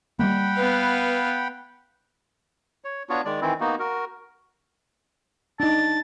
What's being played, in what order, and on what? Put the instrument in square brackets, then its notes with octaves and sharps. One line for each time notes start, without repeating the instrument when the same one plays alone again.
[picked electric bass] G3 G#3 A#3 [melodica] F#5 G5 B5
[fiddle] B3 F5 [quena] B4
[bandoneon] C#5
B3 D4 F4 F#4 C#5
D#3 G#3 D5
D#3 E3 C4 E4
A#3 B3 D#4 F#4
F#4 A#4
[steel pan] D4 D#4 [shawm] A5